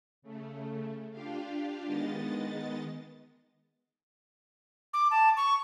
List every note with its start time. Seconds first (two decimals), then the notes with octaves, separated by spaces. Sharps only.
0.22 C#3 A3
1.11 D4 F4 G4 F5
1.85 D#3 G#3 B3 D#5 A6
4.94 D6
5.11 A5
5.37 C#6